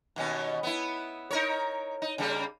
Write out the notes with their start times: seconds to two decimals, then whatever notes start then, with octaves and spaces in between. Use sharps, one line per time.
0.16 D#2 B2 C#4
0.63 B3 E4
1.31 D#4 A#4 C#5
2.02 D#4
2.18 C#3 G3 A#3